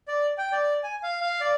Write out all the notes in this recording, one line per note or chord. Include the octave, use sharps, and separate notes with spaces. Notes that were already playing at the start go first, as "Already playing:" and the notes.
D5
G5
D5
G#5
F5
F5
D5